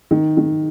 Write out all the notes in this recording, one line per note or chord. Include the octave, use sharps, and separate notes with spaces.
D#3
D#3